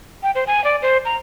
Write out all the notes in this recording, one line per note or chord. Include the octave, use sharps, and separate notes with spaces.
G5
C5
G#5
D5
C5
A#5